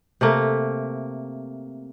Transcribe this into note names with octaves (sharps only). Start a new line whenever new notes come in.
C3 A3 A#3